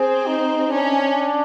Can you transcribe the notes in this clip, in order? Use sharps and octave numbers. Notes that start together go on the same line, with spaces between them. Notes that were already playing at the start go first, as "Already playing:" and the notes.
Already playing: C4 G#4
D#4
C#4 D4